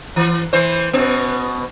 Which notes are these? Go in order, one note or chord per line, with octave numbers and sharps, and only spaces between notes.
E3
E3 C5
B2 B3